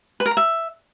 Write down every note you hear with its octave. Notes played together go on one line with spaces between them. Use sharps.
B4
A#4
A#5
E5